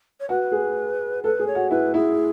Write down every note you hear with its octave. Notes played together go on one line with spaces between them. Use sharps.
C#5
F#4 B4
G#4
A4 B4
G#4
C#5
F#4
E4 B4
E4 G#4